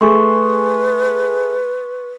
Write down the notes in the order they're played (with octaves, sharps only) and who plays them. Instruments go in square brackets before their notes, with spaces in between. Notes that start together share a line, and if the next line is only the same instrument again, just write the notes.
[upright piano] A3 G#4 [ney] B4 [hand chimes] C6 C#6